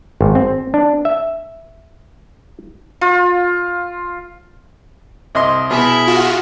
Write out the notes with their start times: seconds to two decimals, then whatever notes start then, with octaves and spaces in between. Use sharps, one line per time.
0.21 G#1
0.35 C4
0.74 D4
1.05 E5
3.01 F4
5.35 C2 D#5 C6
5.71 B2 E4 G#4 E5 F6
6.07 F4 F#4